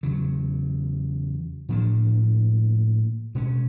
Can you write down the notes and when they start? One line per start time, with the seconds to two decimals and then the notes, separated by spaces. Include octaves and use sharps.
0.03 E2 C#3 F#3
1.69 A2 F3 A#3 D4
3.35 B2 G#3 C#4